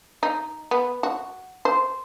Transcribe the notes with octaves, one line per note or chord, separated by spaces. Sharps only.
D#4
B3
F#4
C5